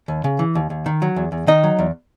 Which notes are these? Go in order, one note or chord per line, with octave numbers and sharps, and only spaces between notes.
D#2
C#3
E3
D#2
D#2
D#3
F#3
E2
E2
D#3 D#4 D#5
F#3
E2